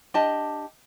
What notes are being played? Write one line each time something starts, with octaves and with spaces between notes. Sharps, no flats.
D4 G4 D#5 A5